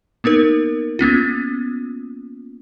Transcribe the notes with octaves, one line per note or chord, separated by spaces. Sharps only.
A#3 B3 D#4 A#4
A#3 B3 C#4 F4